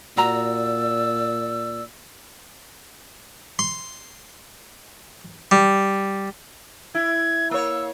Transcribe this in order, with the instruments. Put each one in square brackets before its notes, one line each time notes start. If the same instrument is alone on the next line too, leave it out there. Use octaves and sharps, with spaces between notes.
[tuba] A#2 [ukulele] F#4 A#5 [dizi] D5 [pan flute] E6
[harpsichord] C6
G3
[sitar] E4 [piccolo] G#6
[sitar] A#3 C#5 [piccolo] E6